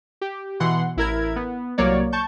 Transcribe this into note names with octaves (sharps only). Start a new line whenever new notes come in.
G4
B2 E3 F#5 C6
A1 E4 A#4 G#6
B3
C2 F#3 A#3 C#5 D5
A5 C#6 G6